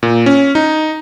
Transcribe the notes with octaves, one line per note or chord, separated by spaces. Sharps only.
A#2
C#4
D#4